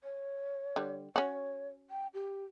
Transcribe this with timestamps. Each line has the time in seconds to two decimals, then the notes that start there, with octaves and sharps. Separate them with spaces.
0.04 C#5
0.76 D3 G3
1.16 C#4 F#4 C#5
1.90 G5
2.14 G4